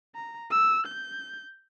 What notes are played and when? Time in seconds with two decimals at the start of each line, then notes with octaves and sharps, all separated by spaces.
0.15 A#5
0.51 E6
0.87 G6